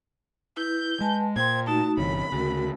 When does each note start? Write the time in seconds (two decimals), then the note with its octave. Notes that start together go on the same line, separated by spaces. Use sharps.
0.57 E4 B4 G6
1.01 G#3 B4 G#5 A5
1.36 A#2 C5 G5 C6 G#6
1.67 A3 D#4 F#4 A5
1.97 G1 C3 E3 C#5 B5
2.32 D2 C#3 F#4 A#4